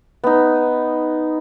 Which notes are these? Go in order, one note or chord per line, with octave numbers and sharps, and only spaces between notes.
B3 D#4